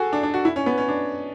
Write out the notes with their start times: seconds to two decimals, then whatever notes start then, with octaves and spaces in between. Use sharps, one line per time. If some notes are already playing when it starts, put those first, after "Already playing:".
Already playing: F#4 G#4 A4
0.13 D4
0.23 D4
0.34 F#4
0.45 E4
0.56 C#4
0.66 B3
0.78 C#4
0.88 D4